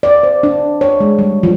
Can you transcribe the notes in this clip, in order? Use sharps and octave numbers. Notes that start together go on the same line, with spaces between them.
D5
C5
D4
C#5
G#3
G3
F3